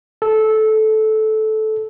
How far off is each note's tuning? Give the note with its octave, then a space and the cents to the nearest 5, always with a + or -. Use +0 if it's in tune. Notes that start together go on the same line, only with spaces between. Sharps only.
A4 -15